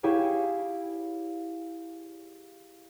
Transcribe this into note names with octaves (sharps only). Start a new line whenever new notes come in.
E4 G4 G#4 C#5 F5